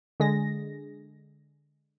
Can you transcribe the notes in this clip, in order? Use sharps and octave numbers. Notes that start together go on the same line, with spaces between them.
D3 G#3 G#4 A#6